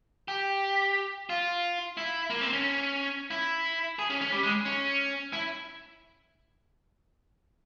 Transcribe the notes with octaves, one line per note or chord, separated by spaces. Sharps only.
G4
F4
E4
A#3
C4
C#4
E4
G#4
C#4
C#4
G3
G#3
C#4
E4